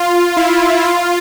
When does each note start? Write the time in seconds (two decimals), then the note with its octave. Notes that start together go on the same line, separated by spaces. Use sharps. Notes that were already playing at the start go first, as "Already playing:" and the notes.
Already playing: F4
0.37 E4
0.85 F4